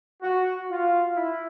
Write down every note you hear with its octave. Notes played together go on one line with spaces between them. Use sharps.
F#4
F4
E4